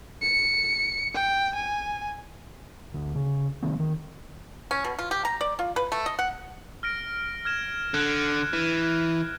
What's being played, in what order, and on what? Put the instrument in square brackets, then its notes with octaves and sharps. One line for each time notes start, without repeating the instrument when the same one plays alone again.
[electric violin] C#7
G5
G#5
[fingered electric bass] D2
C#3
C3 D#3 A#3 C4
D#3
[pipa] C#4
B2
F4
G4
A#5
D5
F4
B4
A3
D#5
F#5
[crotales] F6 A#6 D7
F6 G#6 E7
[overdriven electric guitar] D3 [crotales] F#6 G#6
[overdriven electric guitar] E3